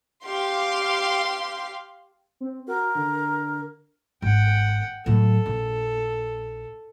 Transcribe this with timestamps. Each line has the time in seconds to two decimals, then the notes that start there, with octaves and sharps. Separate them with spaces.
0.24 G4 F5 C6
2.41 C4
2.68 F#4 A#4
2.95 D3
4.22 G#1 F#5 G5
5.06 A2 F#3 A4
5.46 A#1